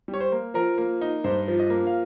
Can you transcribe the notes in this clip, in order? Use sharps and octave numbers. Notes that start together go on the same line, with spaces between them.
G3
C#5
C5
A#3
F3 A#4
A#3
D#4
G2 C5
F3
D#5
A#3
F5